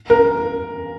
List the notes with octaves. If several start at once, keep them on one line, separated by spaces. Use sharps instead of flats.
A#4